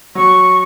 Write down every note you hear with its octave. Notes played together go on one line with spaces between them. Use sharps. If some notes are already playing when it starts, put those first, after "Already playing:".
F#3 C#6